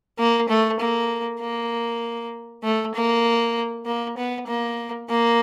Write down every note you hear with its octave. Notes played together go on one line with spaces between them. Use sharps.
A#3
A3
A#3
A#3
A3
A#3
A#3
B3
A#3
A#3